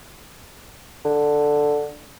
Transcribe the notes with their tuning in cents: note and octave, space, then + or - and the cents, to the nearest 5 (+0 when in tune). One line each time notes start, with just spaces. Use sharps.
D3 +5